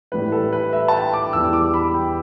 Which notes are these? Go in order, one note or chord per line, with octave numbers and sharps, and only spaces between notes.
A2 E3 G3 B4
A4
B4
E5
A5
G5
D6
E2 E3 G3 E6
D6
B5
G5